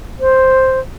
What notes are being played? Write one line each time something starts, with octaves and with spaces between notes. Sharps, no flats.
C5